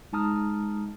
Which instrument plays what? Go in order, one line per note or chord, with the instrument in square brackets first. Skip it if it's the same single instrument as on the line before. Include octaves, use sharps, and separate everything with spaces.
[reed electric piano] G#3 D#4 A5 A#5 D#6 F6